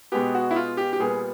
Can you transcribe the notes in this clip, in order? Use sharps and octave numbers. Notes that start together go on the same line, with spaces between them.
B2 G#3 B3 G4
F#4
E4
F4
G4
G4
A#2 G3 B3 G#4